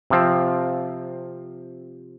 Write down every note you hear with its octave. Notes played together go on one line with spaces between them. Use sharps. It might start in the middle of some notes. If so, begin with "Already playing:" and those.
C3 F3 C4